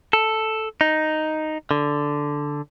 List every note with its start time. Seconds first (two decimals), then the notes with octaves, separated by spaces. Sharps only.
0.13 A4
0.81 D#4
1.71 D3